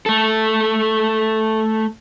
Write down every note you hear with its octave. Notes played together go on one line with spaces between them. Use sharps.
A3 A4